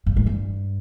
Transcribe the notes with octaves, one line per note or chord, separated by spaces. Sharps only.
G2
G#2
G2